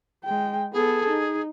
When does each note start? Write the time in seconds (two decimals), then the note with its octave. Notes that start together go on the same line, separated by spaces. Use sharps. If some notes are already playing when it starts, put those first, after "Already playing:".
0.24 G#3 G5
0.73 B3 G#4 A4
1.10 D#4